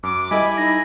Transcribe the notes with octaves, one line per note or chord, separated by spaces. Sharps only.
F#2 D6
G3 E4 A4 D#5 E5 G#5 B5
D#4 A#6